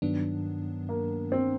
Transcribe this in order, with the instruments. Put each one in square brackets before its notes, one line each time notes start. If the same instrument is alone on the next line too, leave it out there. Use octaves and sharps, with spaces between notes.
[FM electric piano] G2 D#3 F#3 B3 D4
[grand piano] A#3
C4